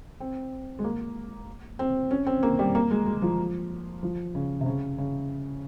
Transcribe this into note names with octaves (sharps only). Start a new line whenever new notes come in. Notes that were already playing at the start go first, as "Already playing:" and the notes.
C4
G#3
A#3
C4
C#4
C4
A#3
G3
A#3
G#3
G#3
F3
F3
C#3
C3
C#3
C#3